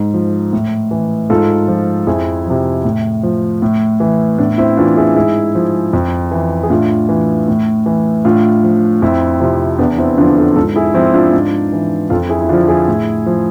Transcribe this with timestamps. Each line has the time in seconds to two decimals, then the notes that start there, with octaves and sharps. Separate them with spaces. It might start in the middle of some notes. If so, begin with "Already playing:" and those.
Already playing: G#2
0.14 F3
0.53 A2
0.91 E3
1.30 G#2 F4 A4
1.68 F3
2.07 F2 E4 G#4
2.46 C3 F3
2.84 A2
3.23 F3
3.62 A2
4.00 E3
4.38 A2 B3 D4
4.58 C4 E4
4.77 E3 D4 F4
4.97 E4 G#4
5.16 G#2 E4 G#4
5.55 F3
5.93 F2
6.32 E3
6.63 G#4
6.70 A2 D4 F4
7.09 E3
7.48 A2
7.86 E3
8.25 A2 D4 F4
8.63 F3
9.02 F2 C4 E4
9.40 C3 F3
9.78 E2 B3 D4
9.98 C4 E4
10.18 D3 F3 D4 F4
10.37 F4 A4
10.56 G#2 F4 A4
10.76 E4 G#4
10.94 F3 C4 E4
11.14 D4 F4
11.33 G#2
11.72 E3
12.10 F2 F4 A4
12.30 E4 G#4
12.42 E4
12.49 D3 F3 D4 F4
12.68 E4 G#4
12.88 A2
13.26 F3